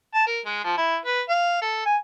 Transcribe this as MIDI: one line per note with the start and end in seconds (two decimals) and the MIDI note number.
0.14 0.25 81
0.26 0.40 70
0.45 0.62 56
0.64 0.73 53
0.77 0.96 64
1.06 1.21 71
1.29 1.61 77
1.62 1.82 69
1.86 1.97 80